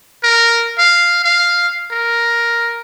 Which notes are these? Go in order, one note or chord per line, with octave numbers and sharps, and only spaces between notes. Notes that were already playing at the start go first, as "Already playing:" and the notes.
A#4
F5
F5
A#4